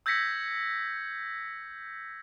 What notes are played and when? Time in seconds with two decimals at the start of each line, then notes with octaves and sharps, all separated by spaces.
0.06 E6 G6 G#6 A#6 B6 C#7